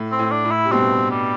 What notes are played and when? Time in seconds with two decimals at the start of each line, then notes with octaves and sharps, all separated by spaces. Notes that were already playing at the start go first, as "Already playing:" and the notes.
Already playing: A2
0.12 C4
0.19 A2
0.31 D4
0.44 A2
0.51 E4
0.65 C3
0.72 G2 B2 C4
1.11 G3